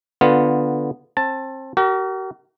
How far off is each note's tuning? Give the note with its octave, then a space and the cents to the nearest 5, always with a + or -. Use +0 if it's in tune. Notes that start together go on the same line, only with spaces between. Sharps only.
D3 +0 B3 +0 F4 +0
C4 +30 A5 +5
F#4 +45 A#4 -10